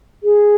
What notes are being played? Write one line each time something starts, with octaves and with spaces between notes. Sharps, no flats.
G#4